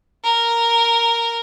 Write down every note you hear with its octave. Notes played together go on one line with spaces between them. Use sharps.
A#4